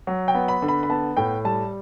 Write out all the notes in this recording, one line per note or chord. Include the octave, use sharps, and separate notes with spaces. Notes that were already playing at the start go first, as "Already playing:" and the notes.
F#3
G5
B3
B5
D3
B5
B5
B3 A5
A2 G5
G3 A5